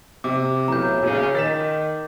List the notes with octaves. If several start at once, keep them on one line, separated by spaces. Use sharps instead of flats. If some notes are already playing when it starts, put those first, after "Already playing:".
C3 D6
B1 A2 E3 A#5 G6
A#1 A#2 C#3
D#3 A6 B6 E7